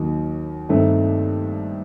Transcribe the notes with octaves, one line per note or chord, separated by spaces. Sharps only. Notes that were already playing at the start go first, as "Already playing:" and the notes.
Already playing: D#2 D#3 F#3
G2 D#3 A3 C4 D#4